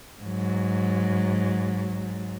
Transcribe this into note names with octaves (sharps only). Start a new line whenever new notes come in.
G#2 F#3